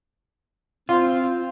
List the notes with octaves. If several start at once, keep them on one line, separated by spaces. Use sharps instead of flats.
C4 F4